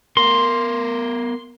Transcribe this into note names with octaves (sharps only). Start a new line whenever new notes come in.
B3 A#4 C6